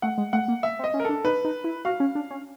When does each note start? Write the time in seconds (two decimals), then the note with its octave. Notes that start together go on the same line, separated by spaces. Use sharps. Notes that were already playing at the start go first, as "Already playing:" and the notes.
0.02 A3 F#5
0.18 G#3
0.33 A3 F#5
0.48 A#3
0.63 E5
0.79 C4
0.84 D#5
0.94 C#4
1.00 A#4
1.05 D4 A4
1.25 D#4 B4
1.45 D#4
1.64 E4
1.85 F#4 F5
2.00 C#4
2.15 D4
2.31 C#4